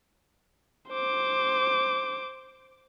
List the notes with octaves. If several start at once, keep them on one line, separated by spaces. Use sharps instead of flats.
C5 D6